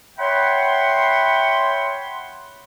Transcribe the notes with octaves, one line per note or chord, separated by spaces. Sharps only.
C#5 E5 F#5 G5 B5 C6